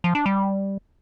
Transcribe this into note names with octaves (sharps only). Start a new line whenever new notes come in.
F3
D4
G3